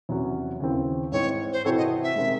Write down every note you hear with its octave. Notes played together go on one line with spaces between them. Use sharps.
E2 C3 F#3 C#4 F#4
D#2 C#3 E3 C4
G#2 E3 C4 D#4 C#5
C5
C3 E3 C4 F#4 A4 C#5
D#5
E5
C3 D#3 G#3